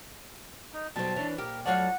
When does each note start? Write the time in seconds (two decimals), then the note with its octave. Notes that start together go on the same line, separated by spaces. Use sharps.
0.74 D#4
0.96 B1 B2 F#3 G3 C4 A5
1.16 E3 D4 C#5
1.38 A#2 G4 A#4
1.66 F2 F#3 C#5 D5 F5 F#5 A5